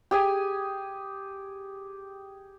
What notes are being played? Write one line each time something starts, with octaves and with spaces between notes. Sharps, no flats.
G4 G#4 G#5